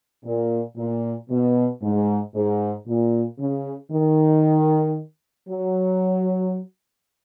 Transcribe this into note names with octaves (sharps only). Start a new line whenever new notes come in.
A#2
A#2
B2
G#2
G#2
A#2
C#3
D#3
F#3